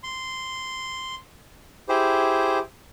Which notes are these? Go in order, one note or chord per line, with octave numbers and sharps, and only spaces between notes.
C6
E4 G4 G#4 C5